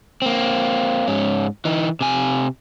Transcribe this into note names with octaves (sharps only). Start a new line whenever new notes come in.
A#3 C4
G#2 C#4
E3 D#4
C3 G#5